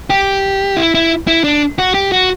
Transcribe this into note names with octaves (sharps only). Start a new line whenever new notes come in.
G4
E4
E4
E4
D4
F#4
G4
F#4